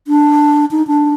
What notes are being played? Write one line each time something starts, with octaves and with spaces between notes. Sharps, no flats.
D4
D#4
D4